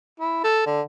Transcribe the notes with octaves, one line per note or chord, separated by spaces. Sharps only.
E4
A4
D3